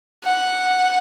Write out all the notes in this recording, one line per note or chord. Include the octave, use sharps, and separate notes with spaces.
F#5